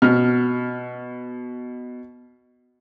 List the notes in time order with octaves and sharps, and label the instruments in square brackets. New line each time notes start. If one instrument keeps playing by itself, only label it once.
[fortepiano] B2 F6